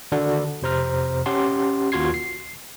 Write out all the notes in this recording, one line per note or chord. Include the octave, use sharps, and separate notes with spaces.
D3 D#3 D4 F#4 D5
F2 C3 C5 A#5 F6
C#4 G4 F#5 A5 C6
D#2 F4 F#4 C6 G#6 C7
C7